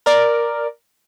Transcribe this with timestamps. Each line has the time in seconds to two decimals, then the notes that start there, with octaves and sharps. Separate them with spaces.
0.06 A#4 D5